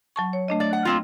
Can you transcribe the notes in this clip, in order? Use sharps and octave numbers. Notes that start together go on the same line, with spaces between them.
F#3 A5 C#6
C#5
A3 D4 D#5
D5
F#5
A#3 C4 F4